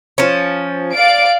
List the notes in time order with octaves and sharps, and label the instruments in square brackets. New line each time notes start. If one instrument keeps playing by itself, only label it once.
[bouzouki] F3 C#4
[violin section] D5 F5 D7